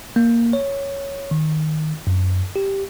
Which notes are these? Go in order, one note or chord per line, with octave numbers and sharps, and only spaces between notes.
A#3
C#5
D#3
F#2
G4